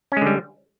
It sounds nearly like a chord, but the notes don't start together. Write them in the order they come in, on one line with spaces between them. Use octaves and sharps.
C#4 G#3 D3 G3